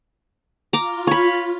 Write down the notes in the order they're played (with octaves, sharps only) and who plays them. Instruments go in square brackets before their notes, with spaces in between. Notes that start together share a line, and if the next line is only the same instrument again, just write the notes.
[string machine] F4 [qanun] A#5 D6
[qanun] C#5 B5